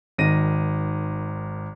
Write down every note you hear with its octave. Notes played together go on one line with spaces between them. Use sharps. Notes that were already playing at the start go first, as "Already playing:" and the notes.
G#1 D#3 A#6 D#7